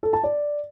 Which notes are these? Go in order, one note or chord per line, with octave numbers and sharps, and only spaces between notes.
A4
A5
D5